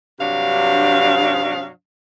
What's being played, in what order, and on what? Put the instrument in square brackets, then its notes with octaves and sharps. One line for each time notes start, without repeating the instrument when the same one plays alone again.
[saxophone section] G2 C3 F#3 D4 F5